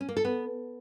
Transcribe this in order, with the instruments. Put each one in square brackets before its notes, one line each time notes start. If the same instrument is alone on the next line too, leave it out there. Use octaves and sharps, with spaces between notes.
[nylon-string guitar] C#4
A#3
A4
B3